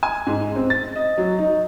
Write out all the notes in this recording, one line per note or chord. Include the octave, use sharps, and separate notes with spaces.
G#5
G#2
C4
A6
D#5
F#3
D#4